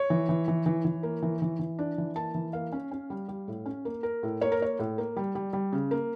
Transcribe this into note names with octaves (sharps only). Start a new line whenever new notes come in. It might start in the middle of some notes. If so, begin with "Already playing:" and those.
Already playing: C#5
E3
E3
E3
E3
E3
A#3
E3
E3
E3
D4
E3
A#3 A5
E3
A#3 F5
C#4
C#4
G3
G3
A2
C#4
A#3
A#3 A#4
A2
A#3 C#5
A#4
A#3 C#5
A2
A#3
G3
G3
G3
C#3
A#3